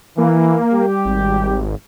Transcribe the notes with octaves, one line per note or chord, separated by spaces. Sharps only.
E3 A#3
G3 G4
G#1